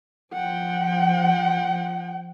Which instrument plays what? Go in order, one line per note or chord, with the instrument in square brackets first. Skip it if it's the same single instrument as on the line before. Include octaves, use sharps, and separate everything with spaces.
[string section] F3 [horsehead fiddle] F#5 G5